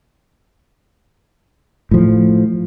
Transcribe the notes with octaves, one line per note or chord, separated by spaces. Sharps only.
A2 F3